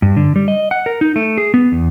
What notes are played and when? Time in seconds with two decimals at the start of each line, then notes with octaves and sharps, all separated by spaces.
0.02 G2
0.17 D3
0.36 G3
0.48 D#5
0.71 F#5
0.86 A#4
1.01 D#4
1.16 A3
1.38 G#4
1.54 B3
1.72 E2